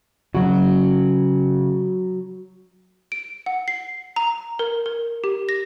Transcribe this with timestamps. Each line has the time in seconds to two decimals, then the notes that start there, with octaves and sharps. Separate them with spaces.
0.35 C#3 F#3 F#4
3.12 D7
3.46 F#5
3.68 C7
4.16 A#5
4.59 A#4
4.86 A#4
5.24 G4
5.49 A#6